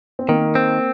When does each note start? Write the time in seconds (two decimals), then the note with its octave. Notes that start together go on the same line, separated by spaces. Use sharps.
0.19 C4
0.28 D#3 A#3
0.55 C4